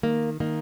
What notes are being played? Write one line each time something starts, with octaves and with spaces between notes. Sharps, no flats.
D#3 A#3
D#3 A#3